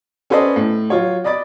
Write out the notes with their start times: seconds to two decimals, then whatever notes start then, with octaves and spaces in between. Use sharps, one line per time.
0.30 C#4 A4 B4 C5 D5 D#5
0.56 A2
0.90 F#3 F4 C#5
1.24 D5 D#5 B5 D6 A6